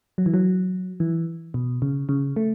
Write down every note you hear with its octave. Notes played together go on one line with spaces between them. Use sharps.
F#3
E3
F#3
E3
B2
C#3
C#3
A3